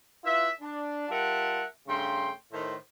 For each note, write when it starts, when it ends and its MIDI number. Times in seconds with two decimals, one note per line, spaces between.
0.24 0.48 64
0.24 0.48 65
0.24 0.48 71
0.24 0.48 76
0.61 1.09 62
1.09 1.63 55
1.09 1.63 65
1.09 1.63 70
1.09 1.63 76
1.09 1.63 78
1.09 1.63 81
1.87 2.31 43
1.87 2.31 49
1.87 2.31 57
1.87 2.31 79
1.87 2.31 84
2.52 2.75 45
2.52 2.75 51
2.52 2.75 72